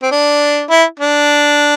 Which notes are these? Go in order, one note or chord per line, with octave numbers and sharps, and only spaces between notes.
C4
D4
E4
D4